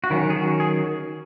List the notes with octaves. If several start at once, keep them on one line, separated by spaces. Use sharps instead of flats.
F#4
D#3 F#3 C#4 E4
G#4
F#4
G#4